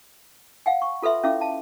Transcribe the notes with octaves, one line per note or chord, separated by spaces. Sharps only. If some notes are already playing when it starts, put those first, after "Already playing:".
F5 F#5 G#5
C#6
F4 A4 B4 E5 C6
C#4 E4 C#5 E5 F5 D6
F5 A5